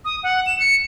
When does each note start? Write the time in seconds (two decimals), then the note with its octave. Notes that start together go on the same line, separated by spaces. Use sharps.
0.05 D#6
0.23 F#5
0.46 E7
0.60 C#7